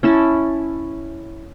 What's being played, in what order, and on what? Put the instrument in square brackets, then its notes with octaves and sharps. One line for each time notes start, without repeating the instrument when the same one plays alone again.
[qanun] C#4 E4 A5